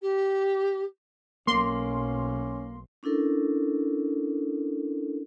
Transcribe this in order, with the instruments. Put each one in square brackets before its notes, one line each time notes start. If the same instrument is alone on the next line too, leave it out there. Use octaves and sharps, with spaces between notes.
[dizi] G4
[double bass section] B1 [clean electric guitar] A#3 [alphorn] C#4 [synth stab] C6
[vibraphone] C#4 D4 E4 A4 A#4